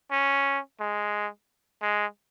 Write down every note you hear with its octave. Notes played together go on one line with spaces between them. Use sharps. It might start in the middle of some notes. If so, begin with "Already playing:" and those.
C#4
G#3
G#3